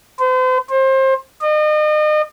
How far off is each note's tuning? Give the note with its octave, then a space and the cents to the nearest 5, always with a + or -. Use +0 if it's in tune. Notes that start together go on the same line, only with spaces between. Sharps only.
C5 -40
C5 +25
D#5 -35